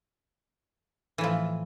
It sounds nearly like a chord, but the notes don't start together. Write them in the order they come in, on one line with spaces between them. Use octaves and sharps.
E3 A2 F3